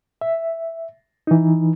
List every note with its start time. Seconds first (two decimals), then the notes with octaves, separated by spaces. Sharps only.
0.21 E5
1.27 E3 D#4